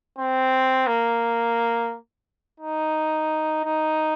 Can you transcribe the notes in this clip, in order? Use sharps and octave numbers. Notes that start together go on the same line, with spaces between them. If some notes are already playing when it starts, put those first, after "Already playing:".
C4
A#3
D#4
D#4